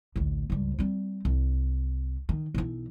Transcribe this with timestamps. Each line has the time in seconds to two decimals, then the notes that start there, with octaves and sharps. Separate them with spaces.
0.16 A1 D2
0.50 C#2 G2
0.79 G3 C4
1.25 C2
2.29 D#3
2.55 B1 E3